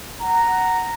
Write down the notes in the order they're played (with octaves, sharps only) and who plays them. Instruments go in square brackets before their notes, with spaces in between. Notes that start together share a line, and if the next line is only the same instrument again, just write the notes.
[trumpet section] F#5 A#5